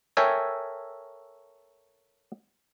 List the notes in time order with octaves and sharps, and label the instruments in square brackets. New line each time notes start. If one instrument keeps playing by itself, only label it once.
[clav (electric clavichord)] A4 A#4 C#5 E5 G5 G#5